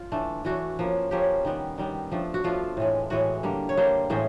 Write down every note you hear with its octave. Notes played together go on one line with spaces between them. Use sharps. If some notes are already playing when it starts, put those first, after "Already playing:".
Already playing: F4
E3 A3 D4
E3 A3 D4 F#4
F3 A#3 C#4
F3 A#3 C#4 G4
D#3 G3 B3
D#3 G3 B3
F3 A3 D4
F#4
F3 A3 D4 F4
A2 E3 G#3
A2 E3 G#3 F#4
D3 G3 A#3
C#5
D3 G3 A#3 C5
A2 E3 G#3 C#4 C5